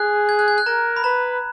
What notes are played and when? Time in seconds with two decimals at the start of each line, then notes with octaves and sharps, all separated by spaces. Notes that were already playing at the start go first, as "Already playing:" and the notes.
Already playing: G#4 F#6
0.29 G#6
0.39 F#6
0.48 G#6
0.58 F#6
0.66 A#4 A#5
0.96 B5
1.04 B4 A#5